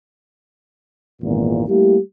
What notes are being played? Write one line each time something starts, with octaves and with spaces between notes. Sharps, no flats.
G#1 E2 A#2
G3 A3 A#3 E4 G4